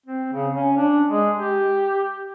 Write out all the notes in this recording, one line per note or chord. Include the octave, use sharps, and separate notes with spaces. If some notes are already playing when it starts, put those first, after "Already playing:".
C4
C#3
C#4
D4
G#3
G4